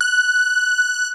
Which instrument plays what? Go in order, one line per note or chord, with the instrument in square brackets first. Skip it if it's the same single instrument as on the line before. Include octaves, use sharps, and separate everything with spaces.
[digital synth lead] F#6